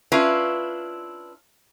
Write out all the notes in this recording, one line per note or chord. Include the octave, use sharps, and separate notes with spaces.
C#4 D4 E4 F4 B4